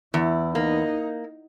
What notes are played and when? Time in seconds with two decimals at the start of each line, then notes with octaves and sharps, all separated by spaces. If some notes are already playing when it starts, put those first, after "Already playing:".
0.14 E2 E4
0.55 A#3 D#4